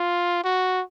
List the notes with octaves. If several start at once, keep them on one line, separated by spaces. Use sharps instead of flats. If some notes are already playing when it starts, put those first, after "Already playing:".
Already playing: F4
F#4